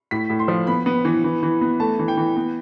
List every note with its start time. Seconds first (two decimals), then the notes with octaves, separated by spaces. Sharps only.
0.11 A2 B6
0.30 A2
0.39 C6
0.48 F3
0.67 B3 B5
0.86 B3
1.05 E3
1.24 E3
1.43 E3
1.61 B3
1.80 A3 A5
1.99 E3
2.08 G5
2.17 E3
2.37 B3